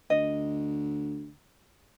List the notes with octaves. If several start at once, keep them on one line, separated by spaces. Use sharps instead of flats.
D2 D#5